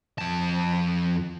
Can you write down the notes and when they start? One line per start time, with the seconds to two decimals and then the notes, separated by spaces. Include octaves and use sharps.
0.18 F2 A5